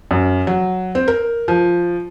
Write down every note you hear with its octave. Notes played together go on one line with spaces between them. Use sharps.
F#2
F#3
C4
A#4
F3